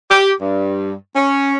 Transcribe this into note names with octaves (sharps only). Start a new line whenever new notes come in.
G4
G2
C#4